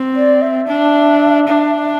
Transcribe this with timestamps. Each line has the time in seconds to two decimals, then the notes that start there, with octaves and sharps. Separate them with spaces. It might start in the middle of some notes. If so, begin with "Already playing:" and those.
Already playing: C4
0.15 D5
0.42 E5
0.68 D4
1.48 D4